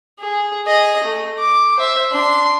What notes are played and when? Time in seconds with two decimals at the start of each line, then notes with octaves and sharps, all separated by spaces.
0.20 G#4
0.66 G#4 D#5
1.04 A3
1.38 D6
1.77 C5 E5
2.12 D4 C6